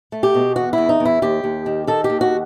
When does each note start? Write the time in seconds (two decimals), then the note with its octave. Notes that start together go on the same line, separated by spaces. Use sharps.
0.12 A3
0.23 G4
0.34 B2
0.56 E2 F#4
0.73 E2 E4
0.89 D#4
1.00 E2
1.05 E4
1.22 D#2 G4
1.44 D#2
1.66 D#3
1.87 D#3 A4
2.04 G4
2.10 D#2
2.21 F#4